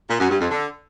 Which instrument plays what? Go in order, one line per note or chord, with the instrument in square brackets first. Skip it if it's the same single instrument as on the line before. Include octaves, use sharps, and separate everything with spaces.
[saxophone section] A#2
F#2
G2
F2
D3